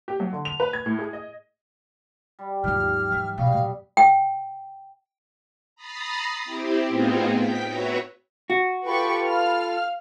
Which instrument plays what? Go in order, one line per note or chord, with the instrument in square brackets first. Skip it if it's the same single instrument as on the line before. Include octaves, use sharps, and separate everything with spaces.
[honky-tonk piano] G4
F#3
D3
F7
B4
G#6
A2
G#4
D#5
[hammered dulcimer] G3
[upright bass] D#2 F3 [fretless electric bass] G#2 D#3 F#3 [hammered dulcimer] G4 [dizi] F6
[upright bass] E3 [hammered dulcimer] E5
[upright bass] B2 [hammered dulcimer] G3 F#4 D#5 [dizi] F5
[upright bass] F#2 A#2
[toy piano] G5
[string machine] A#5 B5 D#6 A6 C7
C4 E4 G4
A2 B3 C4 D#4 F4 G#4
G5 B6
F#4 B4 C#5 E5 A#5
[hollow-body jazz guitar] F#4
[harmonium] F4 A4 [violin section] G4 B4 C#6 [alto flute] B5
[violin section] F5 F6